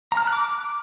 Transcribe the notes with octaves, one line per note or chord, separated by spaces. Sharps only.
A#5
F6
A5
F#6
D6